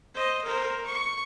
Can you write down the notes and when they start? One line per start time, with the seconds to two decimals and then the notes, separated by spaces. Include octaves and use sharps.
0.14 C5 D#5
0.45 A#4 C5
0.86 C#6